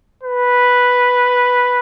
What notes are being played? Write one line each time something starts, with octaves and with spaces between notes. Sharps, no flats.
B4